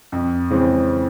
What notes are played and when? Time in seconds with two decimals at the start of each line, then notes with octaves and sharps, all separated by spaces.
0.12 F2
0.50 C#3 E3 G#3 C4